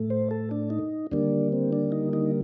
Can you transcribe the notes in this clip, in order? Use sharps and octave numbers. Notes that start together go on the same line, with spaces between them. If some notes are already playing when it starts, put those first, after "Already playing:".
Already playing: A2 A3
C5
A4
D4
D#4
D#2 D3 G3 A#3 D4
C4
D4
D#4
D#4